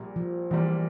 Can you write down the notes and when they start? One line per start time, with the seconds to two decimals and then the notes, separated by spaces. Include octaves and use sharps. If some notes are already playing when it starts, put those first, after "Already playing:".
Already playing: A#1 A#2 G3
0.16 F3
0.51 A#1 A#2 E3 G3